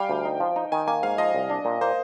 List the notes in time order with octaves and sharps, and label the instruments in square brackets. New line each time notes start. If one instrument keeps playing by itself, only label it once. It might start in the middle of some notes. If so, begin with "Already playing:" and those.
Already playing: [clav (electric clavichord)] G3 [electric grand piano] F5 G5 G#5
[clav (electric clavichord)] D2
D#4
F3
D#4
[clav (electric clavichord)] D#3 [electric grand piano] G#5
[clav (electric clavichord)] A#3 [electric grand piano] G#5
[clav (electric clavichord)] G#2 [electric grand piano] F5
[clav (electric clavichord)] F3 [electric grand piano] D#5
[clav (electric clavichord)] C2
D4
A#2
[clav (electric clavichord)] A#3 [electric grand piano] C5